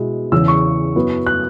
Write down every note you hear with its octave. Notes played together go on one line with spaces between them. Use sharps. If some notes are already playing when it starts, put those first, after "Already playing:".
Already playing: B2 G#3 B3 E4
E2 C#3 E3 E6
C#6
F#2 F#3 B3 E4
F#6